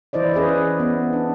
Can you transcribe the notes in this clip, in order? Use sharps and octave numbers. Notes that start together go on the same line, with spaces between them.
E3 E4 C5 D5 D#5
C#4 G#4 B4 D#5
B3
D4